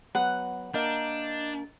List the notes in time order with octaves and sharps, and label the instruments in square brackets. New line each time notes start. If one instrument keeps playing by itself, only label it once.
[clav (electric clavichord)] F#3 B3 [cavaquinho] F#5
[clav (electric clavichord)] A#3 A#4 [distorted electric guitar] D4 [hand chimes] D#5 G6